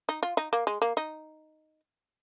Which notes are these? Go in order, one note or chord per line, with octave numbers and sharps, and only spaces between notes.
D#4
F4
D#4
A#3
G#3
A#3
D#4